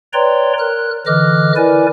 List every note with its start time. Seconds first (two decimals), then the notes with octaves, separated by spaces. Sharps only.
0.13 B4 C#5 D5 G5 A#5 C6
0.59 A#4 F#6
1.07 D3 E3 D#5 D6 F6 F#6
1.56 E4 A#4 B4 D5 G#5